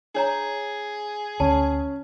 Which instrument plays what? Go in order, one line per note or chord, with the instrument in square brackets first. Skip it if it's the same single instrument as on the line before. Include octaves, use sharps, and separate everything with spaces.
[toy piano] D4 C#5 A#5 [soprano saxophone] G#4
[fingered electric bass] D2 [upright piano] C#4 [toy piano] A5